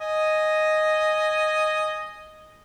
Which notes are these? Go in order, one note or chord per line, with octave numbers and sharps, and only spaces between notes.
D#5 G#5